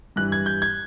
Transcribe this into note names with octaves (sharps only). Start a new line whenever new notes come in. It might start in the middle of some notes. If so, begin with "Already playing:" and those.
G2 E3 G3 F#6
G#6
G6
G#6